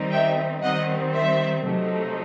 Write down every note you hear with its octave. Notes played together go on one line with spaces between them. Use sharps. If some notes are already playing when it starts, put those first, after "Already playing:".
Already playing: D#3 G3 C4 D#4
E5 G5
D#3 G3 C4 D#5 F#5
C5 E5
C3 F#3 A3 D#4